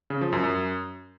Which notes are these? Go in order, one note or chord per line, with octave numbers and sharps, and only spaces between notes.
C#3
F3
F#2
F#2